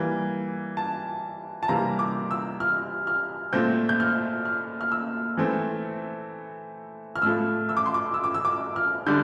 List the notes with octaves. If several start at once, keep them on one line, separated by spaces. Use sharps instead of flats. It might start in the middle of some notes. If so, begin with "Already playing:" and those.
Already playing: E3 G3 A#3
A5
A5
C3 E3 G3 A#3 A#5
D6
E6
F6
F6
A#2 A3 C4 G6
G6
F6
F6
F6
E6
E3 A3 C4
F6
A2 F3 A3 E6
E6
D6
C6
D6
E6
D6
E6
D6
F6
D3 G3 D4 G6